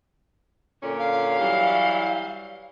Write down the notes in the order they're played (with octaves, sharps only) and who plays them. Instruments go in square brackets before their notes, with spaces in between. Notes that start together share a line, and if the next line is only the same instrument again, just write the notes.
[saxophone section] A#2 D3 C#4
[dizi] F5
[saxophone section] E3 F#3 G3